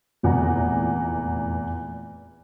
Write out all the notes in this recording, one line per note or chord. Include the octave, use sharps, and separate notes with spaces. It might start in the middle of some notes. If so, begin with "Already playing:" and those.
F1 E2 A#2 F#5 A#5